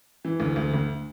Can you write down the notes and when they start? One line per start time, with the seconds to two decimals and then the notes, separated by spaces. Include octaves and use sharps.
0.25 E3
0.40 D2
0.56 D2
0.74 D2